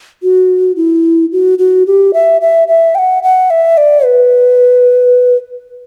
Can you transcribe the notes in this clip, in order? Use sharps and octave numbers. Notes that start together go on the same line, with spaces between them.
F#4
E4
F#4
F#4
G4
E5
E5
E5
G5
F#5
F#5
E5
D5
B4